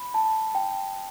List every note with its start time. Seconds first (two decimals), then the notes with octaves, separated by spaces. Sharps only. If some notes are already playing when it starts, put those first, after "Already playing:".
Already playing: B5
0.14 A5
0.55 G5